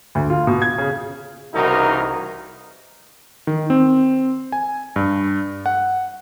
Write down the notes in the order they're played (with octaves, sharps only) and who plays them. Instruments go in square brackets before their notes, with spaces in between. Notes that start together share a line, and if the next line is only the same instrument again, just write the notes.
[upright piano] D2
F4
B2
G#6
C#3
[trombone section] C2 C#3 E3 D#4 F#4 A#4
[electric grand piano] D#3
C4
G#5
G2
F#5